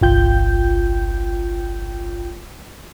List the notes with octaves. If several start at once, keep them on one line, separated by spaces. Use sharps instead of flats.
G1 C2 F4 G5 G6